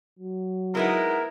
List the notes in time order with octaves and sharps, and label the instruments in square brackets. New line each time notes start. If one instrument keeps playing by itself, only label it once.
[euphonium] F#3
[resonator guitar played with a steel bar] G#3 B3 D#4 [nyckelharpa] E4 [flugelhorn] A#4